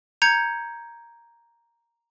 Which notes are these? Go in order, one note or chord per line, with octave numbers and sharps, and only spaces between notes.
A#5 G6 G#6 C#7